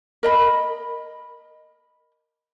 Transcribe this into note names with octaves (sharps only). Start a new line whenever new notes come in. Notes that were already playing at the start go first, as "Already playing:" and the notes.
A#4 D#5 B5